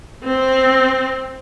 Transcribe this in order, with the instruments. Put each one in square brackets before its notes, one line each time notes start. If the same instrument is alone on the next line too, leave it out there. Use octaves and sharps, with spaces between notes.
[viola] C4